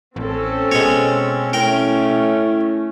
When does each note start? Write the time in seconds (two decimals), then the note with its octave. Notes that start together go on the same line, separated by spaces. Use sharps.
0.16 A1 C4 C#4 A4
0.72 B2 G#3 C#5
1.53 A3 C#4 E4 A#4 G5